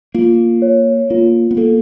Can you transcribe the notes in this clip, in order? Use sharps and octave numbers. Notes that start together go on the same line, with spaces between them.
A#3 F4
C#5
A#3 F4
B3
A#3 A4